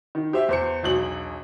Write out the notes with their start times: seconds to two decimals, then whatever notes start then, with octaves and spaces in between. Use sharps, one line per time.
0.15 D#3
0.33 G4 C5 E5
0.49 E2 C5 C#7
0.83 E1 B1 F#7